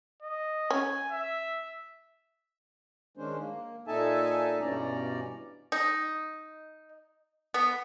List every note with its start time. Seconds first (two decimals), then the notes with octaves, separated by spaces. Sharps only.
0.23 D#5
0.71 C#4 G#5
1.11 E5
3.17 D#3 G#3 C#4 D4 C5
3.39 A#3
3.87 A#2 D#4 A4 E5 G#5 A5
4.61 G2 B2 E3 C#4 D5 A#5
5.72 D#4
7.54 B3